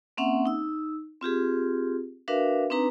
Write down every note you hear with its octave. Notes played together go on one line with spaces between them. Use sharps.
A#3 C4 C#4 E5 F#5
D#4 E6
C4 F4 G4 G#4
D4 F#4 A#4 B4 E5 F5
C4 D4 D#4 B4 A#5